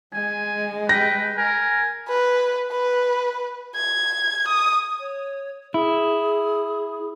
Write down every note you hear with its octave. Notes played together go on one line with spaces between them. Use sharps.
G#3 G#5
B4 G5 A#6
A#4 G#5
B4
B4
G#6
D#6
C#5
E4 G#4